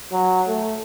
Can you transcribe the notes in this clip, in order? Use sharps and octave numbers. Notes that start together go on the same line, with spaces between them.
F#3
A3